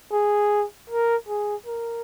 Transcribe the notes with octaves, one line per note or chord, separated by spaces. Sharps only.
G#4
A#4
G#4
A#4